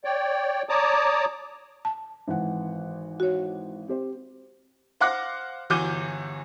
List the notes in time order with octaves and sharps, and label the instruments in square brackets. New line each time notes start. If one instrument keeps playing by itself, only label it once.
[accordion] C#5 D5 G5
C#5 D5 A5 A#5 D6 D#6
[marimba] A5
[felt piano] G#1 E3 F#5
[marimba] F#4 C#5
[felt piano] C4 G4 C5
[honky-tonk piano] C5 F5 F#5 D6 F#6 A#6
G1 E3 F#4 D6 G6 D#7